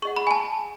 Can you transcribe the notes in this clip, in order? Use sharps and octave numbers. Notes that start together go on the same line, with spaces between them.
G#4 D#5 F#5 C#6
B5
G#5
A5